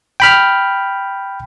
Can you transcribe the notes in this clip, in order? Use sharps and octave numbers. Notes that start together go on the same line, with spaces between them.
G5 B5 F6